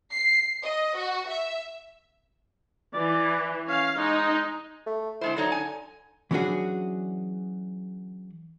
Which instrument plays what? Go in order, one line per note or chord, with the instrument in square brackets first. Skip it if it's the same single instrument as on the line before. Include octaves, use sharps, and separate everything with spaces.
[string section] C7
D#5
F#4
E5
[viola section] E3 [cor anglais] D5
[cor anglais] C#4 [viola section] F5
[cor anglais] G#3 [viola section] D#4
[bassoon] A3
[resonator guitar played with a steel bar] D3 G#3 C5 [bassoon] E4
[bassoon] D3 [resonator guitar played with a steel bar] F#3 D#4 C#5
[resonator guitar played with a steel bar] G#5
[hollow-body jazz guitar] E3 F#3 C#4 D4 F#4 G#4